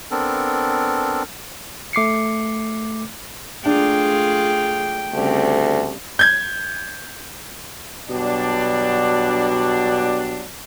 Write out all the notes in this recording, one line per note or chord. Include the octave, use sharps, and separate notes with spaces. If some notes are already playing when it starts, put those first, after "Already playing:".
B3 C4 D4 A4 A#4
A3 D6 C7 C#7
A3 D4 F4 G#4 G5
D2 C#3 G3 C4
G6 G#6
B2 F#3 G3 D4